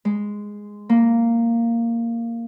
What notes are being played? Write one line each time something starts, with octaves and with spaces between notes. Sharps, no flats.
G#3
A#3